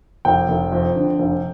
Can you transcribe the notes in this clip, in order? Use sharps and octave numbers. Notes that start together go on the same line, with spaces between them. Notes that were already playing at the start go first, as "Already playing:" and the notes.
F1 G5
F1
F2
D3
F1